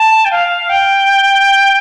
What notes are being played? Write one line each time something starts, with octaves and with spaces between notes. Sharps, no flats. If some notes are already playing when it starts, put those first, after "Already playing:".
Already playing: A5
G5
F5
G5